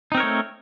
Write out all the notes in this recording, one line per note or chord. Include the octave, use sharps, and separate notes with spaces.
A3 C4 D#4 A#4 C#5